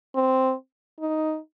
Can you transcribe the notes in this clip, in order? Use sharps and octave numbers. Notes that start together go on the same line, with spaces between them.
C4
D#4